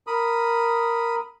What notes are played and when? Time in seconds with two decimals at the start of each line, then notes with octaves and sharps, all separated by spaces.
0.07 A#4 B5 D#6